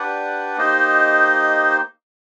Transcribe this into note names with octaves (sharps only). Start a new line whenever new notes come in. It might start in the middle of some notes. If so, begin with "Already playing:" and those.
Already playing: D4 G4 B4 D5 F#5
A#3 D#4 G4 C5 D#5